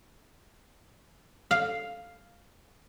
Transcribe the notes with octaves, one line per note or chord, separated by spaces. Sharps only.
F5